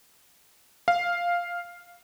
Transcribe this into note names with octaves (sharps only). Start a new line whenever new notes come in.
F5